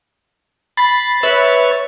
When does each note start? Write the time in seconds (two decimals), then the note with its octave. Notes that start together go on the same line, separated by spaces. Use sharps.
0.77 B5 A6 C7
1.23 B4 C#5 E5 A6